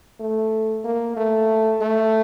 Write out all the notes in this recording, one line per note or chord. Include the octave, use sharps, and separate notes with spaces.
A3
A#3
A3
A3